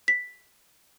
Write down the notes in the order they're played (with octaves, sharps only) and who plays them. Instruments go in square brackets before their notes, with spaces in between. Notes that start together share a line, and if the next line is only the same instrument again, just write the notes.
[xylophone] B6